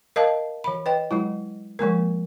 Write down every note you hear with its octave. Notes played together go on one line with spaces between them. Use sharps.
A#4 D#5 F5 A5
E3 B5
B4 D#5 G5
F#3 G#3 E4
F3 G#3 A#3 A#4